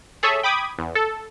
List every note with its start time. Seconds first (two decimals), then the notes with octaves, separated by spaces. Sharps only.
0.23 G#4 A4 C#5 E5
0.43 G5 B5 D6 D#6 G#6
0.79 E2
0.95 A4